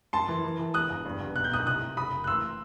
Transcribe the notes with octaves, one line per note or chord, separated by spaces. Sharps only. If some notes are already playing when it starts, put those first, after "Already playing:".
F#2 A5 C6
E3
E3
E3
E1 D#6 F#6
E1
G2
G1
B1 F#6
G6
B1 D#6 F#6
C2 D#6 F#6
C2
F#1 B5 D#6
F#1
F#6
A1 C6 E6